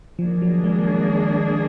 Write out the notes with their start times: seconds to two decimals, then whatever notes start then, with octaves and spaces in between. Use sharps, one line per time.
0.19 D#3 F3 A#3 D4 G#4
0.42 F#3
0.64 G#3